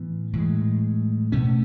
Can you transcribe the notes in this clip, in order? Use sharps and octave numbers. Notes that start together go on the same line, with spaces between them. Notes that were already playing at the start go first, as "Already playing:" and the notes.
Already playing: A2 E3 B3
A2 E3 G#3
B2 A3 C#4